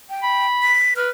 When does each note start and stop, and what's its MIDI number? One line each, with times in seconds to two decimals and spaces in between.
0.10 0.46 79
0.23 0.75 83
0.63 0.94 95
0.96 1.10 71
0.96 1.10 89